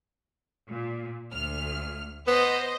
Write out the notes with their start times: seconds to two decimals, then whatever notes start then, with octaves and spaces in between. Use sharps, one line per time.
0.70 A#2
1.31 D2 F6
2.27 B3 C5 D#5